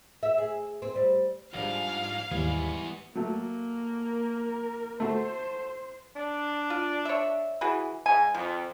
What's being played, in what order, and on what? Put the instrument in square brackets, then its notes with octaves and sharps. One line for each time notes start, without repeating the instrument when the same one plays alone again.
[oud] E5
G#4
C4
G3
[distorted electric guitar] C#2 G#2 [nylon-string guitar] F3 G3 D4 [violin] F5
[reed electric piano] D#2 [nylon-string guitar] G#2 E3 G3 [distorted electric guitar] B3 G#5
[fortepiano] F#3 A3 [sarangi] A#3
[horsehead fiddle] A#4
[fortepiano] A3 F#4 A4 [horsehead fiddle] C5
[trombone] D4
[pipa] F4
C#5 E5
E3 F#4 G#4
[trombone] G#2 [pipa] G#5
[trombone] F2 [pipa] F3